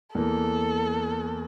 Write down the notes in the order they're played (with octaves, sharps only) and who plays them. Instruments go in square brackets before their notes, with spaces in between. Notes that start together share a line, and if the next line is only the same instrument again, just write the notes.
[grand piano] E2 E3 A#3 [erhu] A4